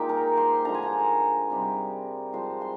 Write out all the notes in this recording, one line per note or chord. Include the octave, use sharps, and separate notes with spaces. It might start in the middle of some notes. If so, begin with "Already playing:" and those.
Already playing: A#2 G#3 D#4 G4 G5
A#4 A#5
C5 C6
D3 F3 G#3 A#5
G#5
A#4 A#5
C3 G3 C4 D#4
F3 G#3 C4 C5 C6
C5 C6